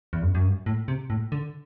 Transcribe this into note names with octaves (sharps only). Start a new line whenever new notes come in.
E2
F#2
F#2
G2
A2
C3
A2
D3